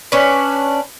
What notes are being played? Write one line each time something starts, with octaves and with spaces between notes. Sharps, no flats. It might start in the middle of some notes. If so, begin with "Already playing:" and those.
C#4 D4 B4